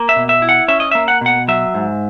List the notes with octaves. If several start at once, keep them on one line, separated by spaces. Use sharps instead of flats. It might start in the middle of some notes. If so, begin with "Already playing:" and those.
Already playing: A#3
E5
B2
E5
E4
F#5
C#4 E5
D#5
A#3 E5
F#5
B2 F#5
F#3 E5
G#2